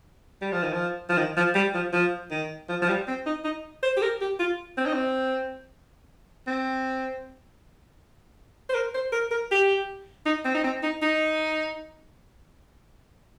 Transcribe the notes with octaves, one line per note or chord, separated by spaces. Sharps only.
G3
F3
D#3
F3
F3
D#3
F3
G3
F3
F3
D#3
F3
F3
G3
C4
D#4
D#4
C5
G4
A#4
G4
F4
C4
D#4
C4
C4
C5
A#4
C5
A#4
A#4
G4
D#4
C4
D#4
C4
D#4
D#4